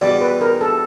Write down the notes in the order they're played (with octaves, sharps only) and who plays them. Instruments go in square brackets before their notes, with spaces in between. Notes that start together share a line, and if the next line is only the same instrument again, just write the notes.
[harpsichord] E2 B2 G3 [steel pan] D5
[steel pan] B4
A#4
A4